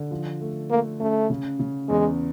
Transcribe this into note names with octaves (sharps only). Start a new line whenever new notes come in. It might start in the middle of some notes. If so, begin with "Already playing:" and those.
Already playing: D3
F3
A3
A3 A#3
A3 C#4
C#3
C#3
E2 G#3